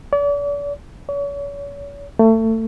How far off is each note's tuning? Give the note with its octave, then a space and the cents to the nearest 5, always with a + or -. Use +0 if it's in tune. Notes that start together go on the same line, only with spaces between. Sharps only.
D5 -40
C#5 +40
A3 +25